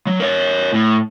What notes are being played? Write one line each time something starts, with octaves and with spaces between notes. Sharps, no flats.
F#3
A#4 C#5
A2